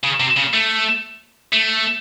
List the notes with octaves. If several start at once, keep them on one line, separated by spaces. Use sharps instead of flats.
C#3
C3
C#3
A3
A3